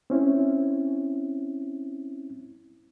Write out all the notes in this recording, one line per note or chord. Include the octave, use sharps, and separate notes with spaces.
C4 C#4 E4